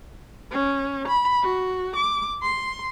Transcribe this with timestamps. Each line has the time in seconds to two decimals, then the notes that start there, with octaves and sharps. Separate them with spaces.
0.51 C#4
1.08 B5
1.42 F#4
1.96 D6
2.42 C6